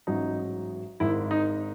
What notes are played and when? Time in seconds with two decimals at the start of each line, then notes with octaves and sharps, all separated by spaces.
0.07 A1 G#2 F#3 D#4
1.00 G#1 G#2 D#3 E4
1.31 D#4